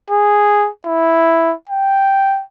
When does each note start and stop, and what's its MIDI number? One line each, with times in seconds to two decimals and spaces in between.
0.10 0.68 68
0.86 1.53 64
1.69 2.42 79